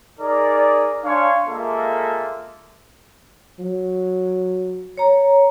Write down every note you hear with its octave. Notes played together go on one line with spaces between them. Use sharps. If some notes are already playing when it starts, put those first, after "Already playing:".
D#4 G#4 A#4 D5
D4 C#5 F5 G#5 C6
G#3 A#3 F4 A4 E5
F#3
C#5 A#5